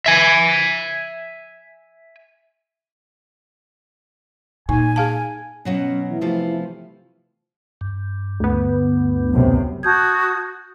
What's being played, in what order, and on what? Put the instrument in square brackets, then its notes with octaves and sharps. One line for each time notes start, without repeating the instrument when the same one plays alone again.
[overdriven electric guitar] E5 G#5
[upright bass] A#2 [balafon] D#4 [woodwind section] G#5
[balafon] G#4 F5 A5
[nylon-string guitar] B2 F#3 F#5 [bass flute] C#4
[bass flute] E3
[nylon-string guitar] C3 F3 A3
[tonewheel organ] G2
[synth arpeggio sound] D2 B3
[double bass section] B1 F#2 C3
[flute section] F#4 D#6 [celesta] A5 G6 G#6